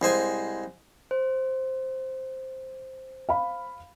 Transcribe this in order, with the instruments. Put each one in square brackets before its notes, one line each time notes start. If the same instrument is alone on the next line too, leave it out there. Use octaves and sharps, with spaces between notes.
[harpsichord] C2 G#3 C5 G#5
[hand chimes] C5
[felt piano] F5 B5